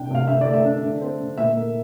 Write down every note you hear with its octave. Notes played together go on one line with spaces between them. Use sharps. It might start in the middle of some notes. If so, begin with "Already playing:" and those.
Already playing: C3 C4 D4 G5
C3 F5
D3 E5
D5
A3
E5
D4
D3
C4
D3
A#2 E5
A#3